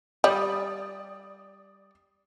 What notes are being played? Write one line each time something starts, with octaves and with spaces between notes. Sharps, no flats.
G3 D5 D#6